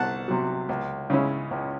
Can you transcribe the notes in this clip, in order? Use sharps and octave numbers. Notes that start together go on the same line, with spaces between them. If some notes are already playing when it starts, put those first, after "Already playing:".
Already playing: C2 F#5 A5
C3 F#3
C#2
C#3 G#3 C#4 E4
C#2